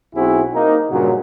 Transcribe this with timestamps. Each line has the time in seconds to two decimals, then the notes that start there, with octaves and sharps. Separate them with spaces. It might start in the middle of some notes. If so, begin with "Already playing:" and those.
0.15 B1 C4 E4 F#4 G#4
0.53 A#3 D#4
0.91 G2 A#2 C#3 F#3